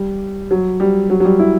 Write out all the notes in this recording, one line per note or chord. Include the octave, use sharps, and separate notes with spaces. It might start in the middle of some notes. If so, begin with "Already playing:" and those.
Already playing: G3
F#3
G3
F#3
F#3
G3
E4